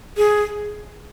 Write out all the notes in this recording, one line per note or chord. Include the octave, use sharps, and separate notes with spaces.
G#4